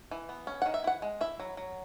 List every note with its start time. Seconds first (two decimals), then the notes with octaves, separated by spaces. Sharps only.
0.11 E3
0.29 B3
0.47 C#4
0.62 D#3 F#5
0.74 E5
0.84 E4 F#5
1.02 G#3
1.21 E4 E5
1.40 F#3
1.57 F#3